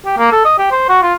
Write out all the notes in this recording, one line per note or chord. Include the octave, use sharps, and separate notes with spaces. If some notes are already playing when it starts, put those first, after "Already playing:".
G4
A#3
A4
D#5
G4
C5
F#4
F4